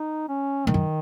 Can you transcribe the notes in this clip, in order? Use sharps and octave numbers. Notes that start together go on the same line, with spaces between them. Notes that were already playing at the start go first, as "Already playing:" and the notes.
Already playing: D#4
C#4
G#2 D#3
F#2